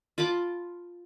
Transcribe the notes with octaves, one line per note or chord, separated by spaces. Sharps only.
F4 A5 B5 D6